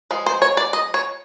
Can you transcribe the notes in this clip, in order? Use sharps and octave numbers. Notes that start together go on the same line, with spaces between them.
F3 G#3
C5
C#5
D5
D#5
C#5